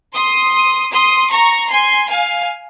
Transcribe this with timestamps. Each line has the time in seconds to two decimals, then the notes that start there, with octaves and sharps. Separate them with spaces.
0.15 C6 D#6
0.93 C6 D#6
1.32 A#5 C#6
1.71 G#5 C6
2.09 F5 G#5